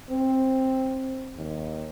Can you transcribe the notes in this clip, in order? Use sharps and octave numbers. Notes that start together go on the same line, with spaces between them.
C4
D#2